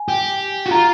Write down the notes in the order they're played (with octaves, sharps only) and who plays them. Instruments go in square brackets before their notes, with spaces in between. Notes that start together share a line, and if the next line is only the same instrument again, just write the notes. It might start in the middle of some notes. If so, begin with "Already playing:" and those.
Already playing: [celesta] G#5
[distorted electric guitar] G4
F#4
[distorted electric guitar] F4 [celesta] A#5